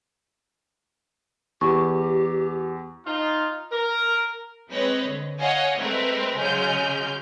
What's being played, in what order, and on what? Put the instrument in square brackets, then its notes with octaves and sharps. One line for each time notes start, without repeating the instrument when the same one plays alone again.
[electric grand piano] E2 [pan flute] G4 [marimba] C#6
[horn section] D#4 F4
A#4
[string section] G#3 C4 B4 C#5 D#5
D3
C#5 D#5 F5 F#5 G#5
G#3 A3 C4 A#4 B4 E5
C#3 F#3 G#3 F6 G6